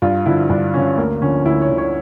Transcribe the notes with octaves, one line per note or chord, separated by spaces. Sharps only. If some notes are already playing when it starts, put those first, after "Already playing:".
G2 F4
D3 F3 E4
G2 D4
D3 F3 C#4
D2 A#3
D3 F3 C#4
D2 E4
C#5
D3 F3
C#5